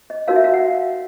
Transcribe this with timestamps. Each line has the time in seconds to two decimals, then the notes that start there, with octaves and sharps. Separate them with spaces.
0.10 D#5
0.28 D#4 F#4 A#4 C#5 F5
0.36 E5
0.44 F5
0.54 F#5